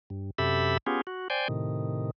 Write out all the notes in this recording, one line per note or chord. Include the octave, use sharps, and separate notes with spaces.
G2
F#2 C3 G4 A4 E5 B5
B3 C#4 F4 G4 G#4
F#4
C5 D5 G5 G#5
A2 C3 D#3